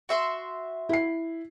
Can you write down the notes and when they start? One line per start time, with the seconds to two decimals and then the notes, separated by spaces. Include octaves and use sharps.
0.09 F#4 E5 C6
0.89 E4 C7